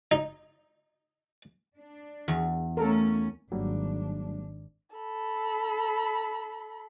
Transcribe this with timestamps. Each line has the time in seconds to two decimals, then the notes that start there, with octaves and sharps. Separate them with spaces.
0.11 D#4
1.76 D4
2.28 E2
2.77 A3 C#4 A4 A#4
3.52 G#1 F#3 G3 A#3 D4
4.96 A4 B5